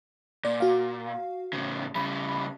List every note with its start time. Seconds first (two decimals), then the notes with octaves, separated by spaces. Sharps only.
0.45 A#2 D5
0.60 F#4 F5
1.53 A2 C#3
1.95 C#3 G3 B5